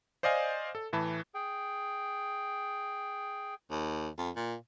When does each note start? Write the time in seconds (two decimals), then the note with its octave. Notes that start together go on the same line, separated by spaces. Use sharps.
0.23 C5 D5 D#5 F5 G#5
0.75 A4
0.93 A2 E3 A5 B5
1.34 G#4 G5
3.71 D#2
4.18 F2
4.36 A#2